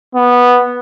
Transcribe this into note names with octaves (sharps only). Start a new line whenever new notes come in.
B3